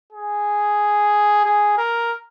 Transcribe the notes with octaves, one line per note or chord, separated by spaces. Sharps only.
G#4
G#4
A#4